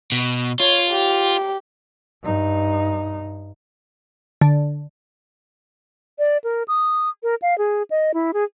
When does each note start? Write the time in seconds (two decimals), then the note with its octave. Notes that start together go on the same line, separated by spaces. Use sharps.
0.12 B2
0.60 F4 C#5
0.91 G4
2.23 G2 D#4
4.41 D3
6.19 D5
6.44 A#4
6.68 D#6
7.23 A#4
7.42 F5
7.58 G#4
7.90 D#5
8.14 E4
8.34 G#4